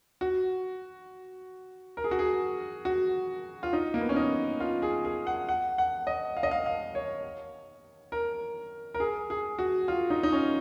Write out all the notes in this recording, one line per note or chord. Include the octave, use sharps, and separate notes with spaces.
F#4
A#4
G#4
F#4
G#4
F#4
F4
D#4
A#3
B3
C#4
D#4
F4
G#4
G#4
F#5
F#5
F#5
D#5
F5
D#5
F5
F5
C#5
A#4
A#4
G#4
G#4
F#4
F4
D#4
D#4
C#4